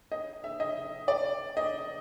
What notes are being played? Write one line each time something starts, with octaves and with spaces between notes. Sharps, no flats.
D#5
E5
D#5
D5
D#5